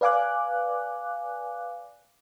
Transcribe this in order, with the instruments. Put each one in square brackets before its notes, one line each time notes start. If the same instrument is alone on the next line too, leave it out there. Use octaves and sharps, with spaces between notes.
[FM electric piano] B4 D5 F5 G#5 D6 F#6